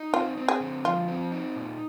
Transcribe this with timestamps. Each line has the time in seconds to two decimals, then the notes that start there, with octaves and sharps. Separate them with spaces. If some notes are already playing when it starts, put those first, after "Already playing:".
Already playing: D#4
0.13 C4 F4
0.37 C4
0.48 G#4
0.60 D3
0.84 F3 F4
1.08 C4
1.32 D#4
1.56 A#2